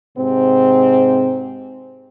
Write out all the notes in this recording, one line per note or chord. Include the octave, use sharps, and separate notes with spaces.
G#2 C3 C4